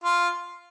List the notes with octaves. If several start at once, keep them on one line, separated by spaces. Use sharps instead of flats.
F4